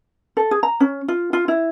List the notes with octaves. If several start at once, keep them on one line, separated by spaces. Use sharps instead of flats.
A4
G#4
A#5
C#4
F4
F4
E4